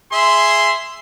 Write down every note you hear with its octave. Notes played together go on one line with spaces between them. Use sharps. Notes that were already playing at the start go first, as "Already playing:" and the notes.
G#4 E5 C6